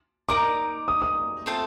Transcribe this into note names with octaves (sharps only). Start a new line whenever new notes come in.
D#4 A#4 D5 D6
D#6
D#6
A3 C4 F4 A4